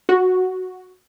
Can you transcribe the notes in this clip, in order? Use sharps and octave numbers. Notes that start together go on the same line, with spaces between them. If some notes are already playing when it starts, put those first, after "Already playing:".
F#4